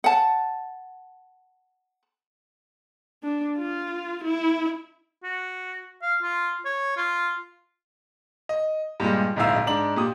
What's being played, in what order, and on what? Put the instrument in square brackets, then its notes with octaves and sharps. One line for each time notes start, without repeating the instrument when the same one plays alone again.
[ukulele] F#5 A5
[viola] D4
F4
E4
[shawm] F#4
F5
F4
C#5
F4
[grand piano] D#5
G2 A#2 G3 G#3
D1 A#1 G#2 E4 F5 E6
G#2 D4 F#7
A#2 G4 D#6